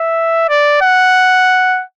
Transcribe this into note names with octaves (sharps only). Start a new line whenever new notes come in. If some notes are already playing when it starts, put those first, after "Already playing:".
Already playing: E5
D5
F#5